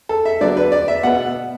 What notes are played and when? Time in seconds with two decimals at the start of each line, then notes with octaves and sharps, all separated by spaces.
0.09 A4
0.25 E5
0.41 D3 F#3 B3 D5
0.57 B4
0.72 D5
0.88 E5
1.03 B2 B3 F#5